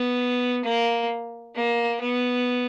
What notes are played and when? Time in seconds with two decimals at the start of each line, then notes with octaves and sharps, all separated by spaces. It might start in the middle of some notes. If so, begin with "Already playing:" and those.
Already playing: B3
0.64 A#3
1.55 A#3
2.00 B3